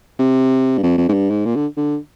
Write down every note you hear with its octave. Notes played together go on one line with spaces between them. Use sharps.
C3
G2
F2
F2
G#2
G2
G#2
A#2
D3
D3